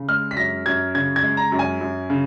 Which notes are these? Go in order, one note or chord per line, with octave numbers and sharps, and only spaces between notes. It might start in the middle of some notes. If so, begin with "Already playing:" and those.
Already playing: C#3
G#3 F6
B6
F#2 A#6
F#2 G#6
C#3 G#6
G#6
G#3
A#5
F#2
G#5
F#2
C#3